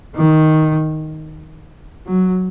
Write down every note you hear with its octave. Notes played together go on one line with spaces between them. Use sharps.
D#3
F#3